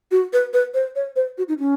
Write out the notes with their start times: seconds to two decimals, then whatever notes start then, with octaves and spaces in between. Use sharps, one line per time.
0.11 F#4
0.33 B4
0.53 B4
0.74 C5
0.96 C#5
1.16 C5
1.38 F#4
1.48 D#4
1.59 C#4